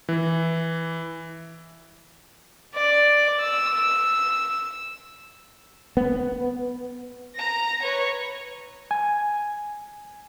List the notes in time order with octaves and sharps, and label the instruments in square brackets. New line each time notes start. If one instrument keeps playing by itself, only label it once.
[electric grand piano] E3
[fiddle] D5
E6
[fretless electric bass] B3
[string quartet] A#5 A#6
B4 C#5
[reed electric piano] G#5